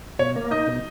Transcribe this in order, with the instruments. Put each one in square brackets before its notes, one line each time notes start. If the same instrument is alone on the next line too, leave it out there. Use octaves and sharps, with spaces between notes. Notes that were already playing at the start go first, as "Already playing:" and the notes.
[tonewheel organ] B2 [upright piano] C#5
[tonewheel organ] A#3
[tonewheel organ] D#4 [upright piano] D#5
[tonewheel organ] B2